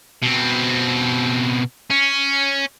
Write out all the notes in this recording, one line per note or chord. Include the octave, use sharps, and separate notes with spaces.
B2 C4
C#4